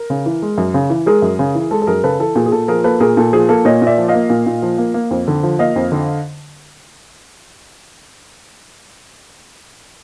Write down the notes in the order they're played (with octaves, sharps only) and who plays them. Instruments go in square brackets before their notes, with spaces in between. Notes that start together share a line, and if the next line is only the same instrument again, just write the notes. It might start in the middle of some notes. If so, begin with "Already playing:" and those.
Already playing: [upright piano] A#4
C#3
E3
G#3
F#2
C#3
E3
G#3 G#4 A#4
F#2
C#3
E3
G#3 A4
A4
F#2 G#4 A#4
C#3 A4 B4
E3 A4
A#2 G#4
G#4
A#2 A4
F3 G#4 A#4
A#3 A4 B4
A#2 G#4 A#4
A#2 A4
F3 G#4
A#3 A4
A#2 C#5 D#5
A#2
D5 E5
F3
D#5 F5
A#3
A#2
A#2
F3
A#3
A#3
F2
D3
F3
A#3 D#5 F5
F2
D3